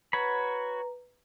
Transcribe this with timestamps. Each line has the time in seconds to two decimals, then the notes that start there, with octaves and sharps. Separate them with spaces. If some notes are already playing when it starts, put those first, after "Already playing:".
0.13 F#4 B4 C#5 A#5 B5